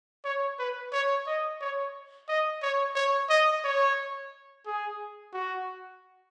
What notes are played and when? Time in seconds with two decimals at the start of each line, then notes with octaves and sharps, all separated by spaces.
0.25 C#5
0.59 B4
0.92 C#5
1.27 D#5
1.61 C#5
2.29 D#5
2.62 C#5
2.95 C#5
3.30 D#5
3.64 C#5
4.66 G#4
5.33 F#4